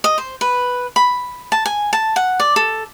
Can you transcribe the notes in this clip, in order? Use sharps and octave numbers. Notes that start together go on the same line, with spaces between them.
D#5
C5
B4
B5
A5
G#5
A5
F#5
D5
A4